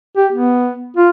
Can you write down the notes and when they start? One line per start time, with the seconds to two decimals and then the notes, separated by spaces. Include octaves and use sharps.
0.17 G4
0.33 B3
0.97 F4